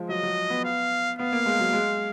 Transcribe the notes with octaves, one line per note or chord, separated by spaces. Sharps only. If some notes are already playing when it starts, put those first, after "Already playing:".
Already playing: F3 G#3
F#3 D#5
F#3
B3
F5
B3 F5
A#3
G#3
F#3
G#3